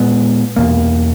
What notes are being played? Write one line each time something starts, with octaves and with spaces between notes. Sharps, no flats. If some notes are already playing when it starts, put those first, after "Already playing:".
Already playing: A#2 G#3 B3
E2 B2 A#3